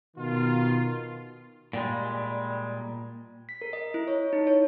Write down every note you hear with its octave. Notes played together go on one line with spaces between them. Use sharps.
B2 D#3 F4
A#2 G3 G#3
B6
A#4
D#5
E4
C#5
D#4
C#5